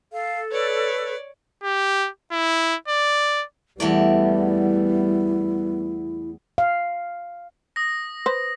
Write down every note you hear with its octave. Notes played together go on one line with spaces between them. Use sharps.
A4 F5
B4 C#5 D5
G4
E4
D5
E2 G3 A3 B3 E4 D5
F5
D#6 A#6
B4 C5